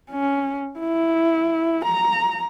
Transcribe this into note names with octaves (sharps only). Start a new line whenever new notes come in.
C#4
E4
A#5